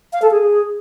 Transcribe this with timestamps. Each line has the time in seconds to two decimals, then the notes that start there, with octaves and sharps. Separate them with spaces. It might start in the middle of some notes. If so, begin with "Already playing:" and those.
0.13 F5
0.22 A4
0.31 G#4